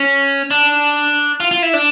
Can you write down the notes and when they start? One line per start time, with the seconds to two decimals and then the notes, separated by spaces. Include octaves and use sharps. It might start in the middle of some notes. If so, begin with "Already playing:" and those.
Already playing: C#4
0.51 D4
1.40 F4
1.51 F4
1.62 E4
1.73 D4